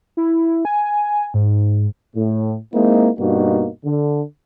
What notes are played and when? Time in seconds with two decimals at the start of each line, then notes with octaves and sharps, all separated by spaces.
0.17 E4
0.65 G#5
1.34 G#2
2.15 A2
2.73 G#3 A#3 C4 D#4 E4
3.19 G2 B2 A#3 D#4 F#4
3.85 D3